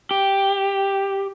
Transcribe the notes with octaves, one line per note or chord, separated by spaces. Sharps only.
G4